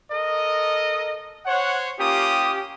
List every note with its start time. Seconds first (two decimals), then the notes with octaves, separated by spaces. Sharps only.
0.11 A4 A#4 D#5
1.45 C5 C#5 F#5
1.99 A#3 C#4 F4 G4 D#6